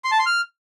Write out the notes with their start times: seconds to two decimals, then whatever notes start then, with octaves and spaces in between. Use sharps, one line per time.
0.04 C6
0.12 A5
0.19 C6
0.26 F6